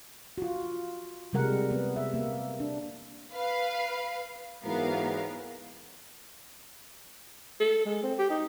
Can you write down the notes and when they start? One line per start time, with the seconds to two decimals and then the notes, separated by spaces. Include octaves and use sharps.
0.38 F4 F#4
1.33 C3 G3 G#3 A#4 F#5
1.71 B3
1.96 E5
2.14 A#3
2.60 D4
3.33 B4 F5
4.63 G#2 E3 F#3 B3 A#4 F5
7.60 A4
7.86 G#3
8.03 C4
8.19 G4
8.30 D#4